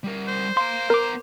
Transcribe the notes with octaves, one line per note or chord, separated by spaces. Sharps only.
G3 A#4
C5
F5 A#5 C6
B3 A#4 A#5 D6